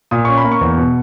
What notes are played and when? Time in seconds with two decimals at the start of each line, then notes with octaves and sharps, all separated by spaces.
0.11 A#2 D#6
0.25 C#4 C#6
0.38 B5
0.44 A#3
0.52 C#6
0.61 E2
0.77 B2